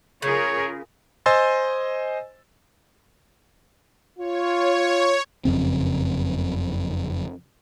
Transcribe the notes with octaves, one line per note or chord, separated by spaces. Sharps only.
C#3 F4 G#4 A#4 C#5
C5 D#5 G#5 C6 E6 A6
F4 C#5
F#1 F2 C#3 C4